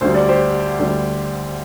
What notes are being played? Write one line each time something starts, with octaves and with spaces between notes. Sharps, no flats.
D2 D3 G3 C5
D5
G4 C5
D2 D3 G3